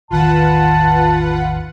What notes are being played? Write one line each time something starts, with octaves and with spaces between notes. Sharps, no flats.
A1 E2 D#3 F4 B4 F#5 A5